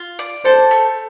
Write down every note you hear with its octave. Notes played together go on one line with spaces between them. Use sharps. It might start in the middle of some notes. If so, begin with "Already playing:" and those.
Already playing: F4
D5
A4 C5
A3